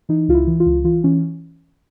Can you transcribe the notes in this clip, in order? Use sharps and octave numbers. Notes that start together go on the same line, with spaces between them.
E3 D#4
C#2 F4
E4
E3
F4
C#2
E3 F4
E3 C#4